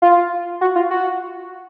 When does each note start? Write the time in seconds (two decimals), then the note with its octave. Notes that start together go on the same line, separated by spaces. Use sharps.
0.02 F4
0.61 F#4
0.76 F4
0.91 F#4